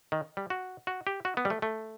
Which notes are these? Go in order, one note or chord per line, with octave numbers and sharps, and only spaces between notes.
D#3
G3
F#4
F#4
G4
F#4
B3
G3
A3
A3